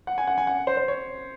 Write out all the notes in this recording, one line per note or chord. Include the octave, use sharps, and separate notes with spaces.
F#5
G#5
F#5
G#5
F#5
C5
C5
C#5